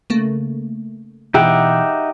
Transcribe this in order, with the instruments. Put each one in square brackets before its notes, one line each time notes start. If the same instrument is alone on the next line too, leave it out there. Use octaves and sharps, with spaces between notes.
[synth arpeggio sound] C#3 A3 A#3
[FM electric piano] B2 E3 [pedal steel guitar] D#4 E5 F#5 [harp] G4